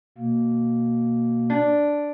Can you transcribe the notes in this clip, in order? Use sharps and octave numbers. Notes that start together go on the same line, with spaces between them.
B2 A#3
D4